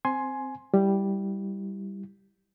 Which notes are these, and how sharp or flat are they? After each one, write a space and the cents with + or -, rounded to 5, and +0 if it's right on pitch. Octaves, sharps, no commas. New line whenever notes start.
C4 +0 G#5 +15 C6 +10
G3 +0 E4 +0